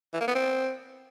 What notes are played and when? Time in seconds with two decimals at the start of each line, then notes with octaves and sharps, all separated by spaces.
0.13 E3
0.21 A#3
0.28 B3
0.35 C4